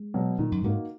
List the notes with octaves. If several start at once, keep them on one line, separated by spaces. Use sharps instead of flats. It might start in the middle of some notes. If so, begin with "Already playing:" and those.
Already playing: G#3
B2 F#3
A#2 D#3
F#2
G#2 A#3 D#4 F#4